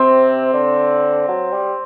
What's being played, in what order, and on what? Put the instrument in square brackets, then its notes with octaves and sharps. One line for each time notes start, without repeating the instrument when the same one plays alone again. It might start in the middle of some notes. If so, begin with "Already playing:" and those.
Already playing: [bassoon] C3 [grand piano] C4
[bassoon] D3
F#3
G3